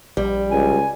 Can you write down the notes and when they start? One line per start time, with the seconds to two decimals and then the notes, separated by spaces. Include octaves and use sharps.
0.17 A#1 G3
0.51 C#2 G#5